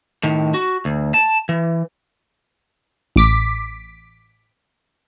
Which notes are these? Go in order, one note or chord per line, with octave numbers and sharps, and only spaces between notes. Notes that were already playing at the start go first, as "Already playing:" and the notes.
A2 D#3
F#4
D2
A5
E3
A1 D6 B6